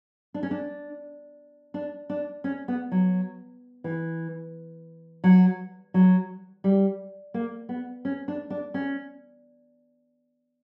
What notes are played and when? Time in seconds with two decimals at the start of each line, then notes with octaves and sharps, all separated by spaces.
0.34 D4
0.43 C#4
0.51 D4
1.74 D4
2.10 D4
2.44 C#4
2.68 B3
2.92 F#3
3.84 E3
5.24 F#3
5.94 F#3
6.64 G3
7.34 A#3
7.69 B3
8.05 C#4
8.28 D4
8.50 D4
8.74 C#4